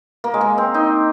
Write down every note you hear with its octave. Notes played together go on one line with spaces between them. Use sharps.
A#3
G#3
A#3
C4
D#4